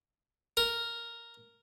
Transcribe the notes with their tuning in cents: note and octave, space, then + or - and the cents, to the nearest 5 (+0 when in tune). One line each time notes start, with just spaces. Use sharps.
A#4 +0